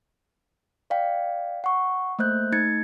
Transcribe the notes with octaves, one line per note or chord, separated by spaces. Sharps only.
D5 F5 G5
F#5 C#6
A3 A#3 C5 F#6 G6
A3 D#4 G#6 A6 C#7